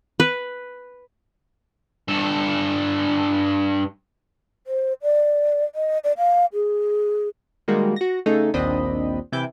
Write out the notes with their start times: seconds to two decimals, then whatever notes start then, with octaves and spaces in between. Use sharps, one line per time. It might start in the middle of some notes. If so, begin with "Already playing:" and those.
0.20 B4
2.08 G2 A4
4.67 C5
5.03 D5
5.75 D#5
6.04 D5
6.18 F5
6.54 G#4
7.68 D#3 G3 G#3 A#3 F#4
7.96 F#4 A#6
8.26 C#3 A3 D#4 G#4 A4
8.54 A#1 D#2 C4 D4 D#5 B5
9.32 C3 E3 E4 D6 G6